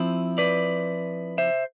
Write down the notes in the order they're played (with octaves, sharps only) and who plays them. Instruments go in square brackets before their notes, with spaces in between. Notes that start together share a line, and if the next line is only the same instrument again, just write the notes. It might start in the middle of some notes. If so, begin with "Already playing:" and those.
Already playing: [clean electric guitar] F3 C4 E4
B4 D5
C5 E5